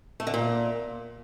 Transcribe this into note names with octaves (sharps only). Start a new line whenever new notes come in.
A3
D3
A#2